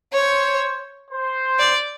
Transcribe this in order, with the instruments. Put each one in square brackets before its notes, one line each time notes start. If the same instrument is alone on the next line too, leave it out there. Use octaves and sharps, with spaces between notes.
[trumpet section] C5 [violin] C#5
[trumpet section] C5
[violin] D5